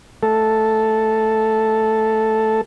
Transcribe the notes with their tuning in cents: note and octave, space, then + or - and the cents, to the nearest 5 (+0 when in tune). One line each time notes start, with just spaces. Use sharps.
A3 +0 A4 +0